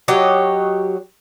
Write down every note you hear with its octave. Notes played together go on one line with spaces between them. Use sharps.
F#3 G4 C#5 D#5